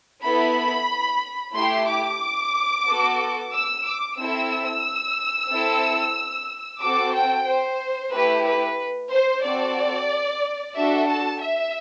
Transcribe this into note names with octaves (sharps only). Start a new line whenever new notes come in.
B3 E4 A4 B5
A3 E4 G4 C6
D6
B3 F#4 A4
E6
D6
C4 E4 A4 E6
C4 E4 A4
C4 F#4 A4 D6
G5
C5
A3 E4 G4 B4
B4
C5
C4 F#4 A4 D5
D4 F#4 A4 E5
A5
E5